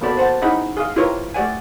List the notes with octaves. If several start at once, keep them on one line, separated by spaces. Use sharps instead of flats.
A#3 B3 F#4 A4 D5 B5
C5 F#5 A5
C#4 D#4 E4 G#4 F#5 B5
G#4 F5
E4 F4 G4 A#4 B4 C#5
A3 G4 D5 F#5 G#5